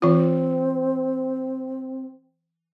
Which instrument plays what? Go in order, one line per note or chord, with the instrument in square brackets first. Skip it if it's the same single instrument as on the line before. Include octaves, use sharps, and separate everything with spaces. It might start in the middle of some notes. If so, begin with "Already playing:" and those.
[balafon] E3 F4 [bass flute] C4